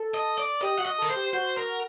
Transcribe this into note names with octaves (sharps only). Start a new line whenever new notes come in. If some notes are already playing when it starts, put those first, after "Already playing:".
Already playing: A4
D#5
D5
G4 D#5
F#4 F#5
D#5
A4 A#4
C5
G4
F#4 C5
A#4